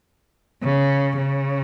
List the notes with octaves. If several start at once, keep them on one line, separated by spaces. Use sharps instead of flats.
C#3
C#3